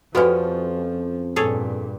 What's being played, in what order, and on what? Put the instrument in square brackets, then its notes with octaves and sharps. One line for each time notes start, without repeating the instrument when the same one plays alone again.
[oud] F2 C#4 [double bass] F3 [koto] B3 G4 [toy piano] F#4 B4 D5
[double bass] G2 A#2 [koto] G#4 A4 C#5